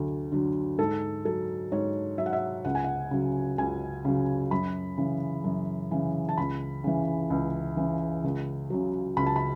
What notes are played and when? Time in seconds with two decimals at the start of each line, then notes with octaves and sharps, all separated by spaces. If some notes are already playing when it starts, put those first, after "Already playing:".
Already playing: D2 D3 F#3
0.32 D3 F#3
0.78 G#2 A4
1.25 F#3 A4
1.72 G#2 C#5
2.18 F#3 E5
2.26 F#5
2.33 E5
2.65 C#2 F#5
2.75 G#5
2.84 F#5
3.11 C#3 F#3
3.58 C#2 G#5
4.05 C#3 F#3
4.51 F#2 B5
4.98 C#3 E3
5.44 F#2
5.91 C#3 E3
6.29 A5
6.38 C#2 B5
6.84 C#3 E3
7.30 C#2
7.77 C#3 E3
8.24 C#2
8.70 C#3 F#3
9.17 C#2 B5
9.26 A5
9.36 B5